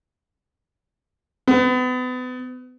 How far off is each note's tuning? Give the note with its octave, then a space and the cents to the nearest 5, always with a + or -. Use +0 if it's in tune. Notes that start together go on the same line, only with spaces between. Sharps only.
B3 +35